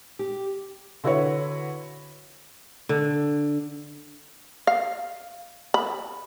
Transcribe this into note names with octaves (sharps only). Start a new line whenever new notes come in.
G4
D3 E4 F#4 B4 C#5
D3
F5
B5